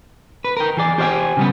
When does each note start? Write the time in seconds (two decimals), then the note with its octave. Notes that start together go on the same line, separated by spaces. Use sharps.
0.44 B4
0.57 A#4 G5
0.77 E3 G#4 D5
0.98 G4 C5 D5 F5 G5 G#5
1.37 C#3 G3 B3